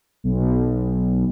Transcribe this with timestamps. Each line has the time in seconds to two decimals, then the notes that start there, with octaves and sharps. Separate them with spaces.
0.24 B1